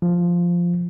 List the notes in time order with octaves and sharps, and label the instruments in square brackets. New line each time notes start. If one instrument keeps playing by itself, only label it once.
[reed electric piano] F3